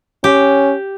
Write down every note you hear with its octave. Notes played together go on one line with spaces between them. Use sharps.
C#4 G4